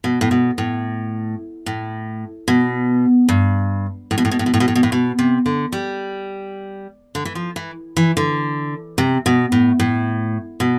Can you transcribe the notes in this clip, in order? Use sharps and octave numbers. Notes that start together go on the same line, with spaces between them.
B2
A2
B2
A2
A2
B2
G2
A2
B2
A2
B2
A2
B2
A2
B2
A2
B2
A2
B2
C3
D3
G3
D3
E3
F3
E3
E3
D3
C3
B2
A2
A2
B2